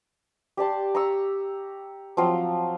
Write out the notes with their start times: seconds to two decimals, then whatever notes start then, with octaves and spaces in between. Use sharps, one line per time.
0.57 G4 D5 A5 C6
0.95 A#5 C#6 E6
2.17 F3 F#3 C4 F4